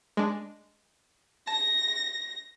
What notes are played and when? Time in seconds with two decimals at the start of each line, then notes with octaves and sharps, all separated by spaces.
0.17 G#3 D4
1.47 A5 A#6